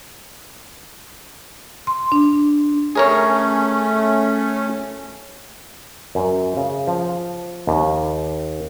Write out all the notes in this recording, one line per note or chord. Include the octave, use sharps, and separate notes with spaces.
C6
D4
A3 C#4 G#4 A#4 C#5
F#2
C#3
F3
D#2